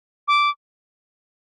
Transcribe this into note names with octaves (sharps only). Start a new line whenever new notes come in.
D6